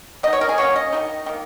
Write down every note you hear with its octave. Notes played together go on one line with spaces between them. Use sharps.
F#3 D#4 D#5
C#5
A#4
G#4
F#3 A#3 C#4 C#5
D#5
D#3 A#3 D#4
D#3 A#3